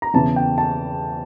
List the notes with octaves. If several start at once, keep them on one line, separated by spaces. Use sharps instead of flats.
A#5
E2 C#3 E3 A5
G5
A5